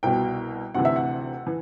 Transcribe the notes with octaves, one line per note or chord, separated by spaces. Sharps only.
C2 B2 G5
D2 C3 E3 F#5
E5
F#5
E3